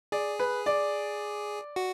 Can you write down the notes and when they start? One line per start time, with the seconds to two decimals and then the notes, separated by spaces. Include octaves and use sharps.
0.12 G#4 D5
0.39 B4
0.66 D5
1.76 F#4